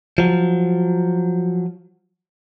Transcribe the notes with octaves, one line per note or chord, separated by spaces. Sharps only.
F3 F#3